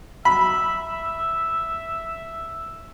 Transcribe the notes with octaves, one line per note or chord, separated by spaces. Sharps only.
E5 B5